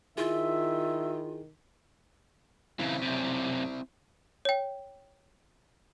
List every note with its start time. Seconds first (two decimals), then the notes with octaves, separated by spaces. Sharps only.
0.18 D#3 E4 F4 G#4 E5
2.79 C#3 E3 C4 E4
3.02 F#2 C3
4.45 C#5 G5